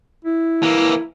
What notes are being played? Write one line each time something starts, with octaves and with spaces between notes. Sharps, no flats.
E4
E3 A#3